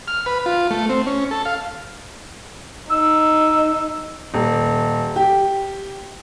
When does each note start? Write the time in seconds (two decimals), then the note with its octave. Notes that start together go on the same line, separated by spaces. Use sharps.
0.08 F6
0.26 B4
0.46 F4
0.70 A3
0.89 C4
1.06 C#4
1.31 A4
1.45 F5
2.91 D#4 E6
4.34 D#1
5.16 G4